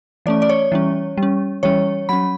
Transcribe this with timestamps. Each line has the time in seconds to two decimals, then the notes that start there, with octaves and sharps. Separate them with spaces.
0.26 E3 A3 C#4 D5
0.42 D5
0.49 C#5
0.72 E3 G3 C#4
1.17 G3
1.23 C#4
1.63 E3 G3 C#4 C#5
2.09 F#3 C#4 B5